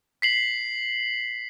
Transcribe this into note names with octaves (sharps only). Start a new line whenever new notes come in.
B6 C7 F#7